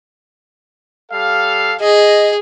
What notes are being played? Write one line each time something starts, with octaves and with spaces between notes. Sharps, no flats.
G3 A4 F5
G#4 D#5